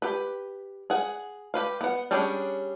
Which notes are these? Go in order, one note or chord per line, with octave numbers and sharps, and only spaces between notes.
G4 B4
G#4 F#5
G4 B4 F5
B3 F#5
G3 C#4 D4 G#4 G5